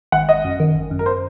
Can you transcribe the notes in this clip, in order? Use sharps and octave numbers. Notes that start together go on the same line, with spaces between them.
G#1 F#5
G#1 D#5
F#2
D#3
G#1
F#2
A#4
C5